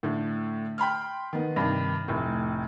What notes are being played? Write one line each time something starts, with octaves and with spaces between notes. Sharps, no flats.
A2 D3
G5 B5 C6 F6
D#3 B3
G2 C3 D#3
F1 A2